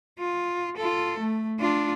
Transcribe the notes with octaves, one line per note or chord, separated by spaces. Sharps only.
F4
F4 A4
A3
D4 F4